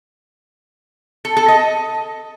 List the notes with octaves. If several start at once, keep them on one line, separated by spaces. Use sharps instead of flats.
A4
A4
D#5